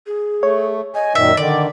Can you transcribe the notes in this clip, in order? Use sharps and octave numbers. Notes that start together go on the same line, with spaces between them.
G#4
A3 C#5
D#5 G#5
F#2 A#2 D#3 E5
D3 D#3 D5